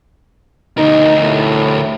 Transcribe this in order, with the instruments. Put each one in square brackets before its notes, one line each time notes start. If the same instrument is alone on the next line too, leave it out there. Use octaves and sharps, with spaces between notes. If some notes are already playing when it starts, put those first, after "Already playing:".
[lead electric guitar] D2 A#4 [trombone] D#4
[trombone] A2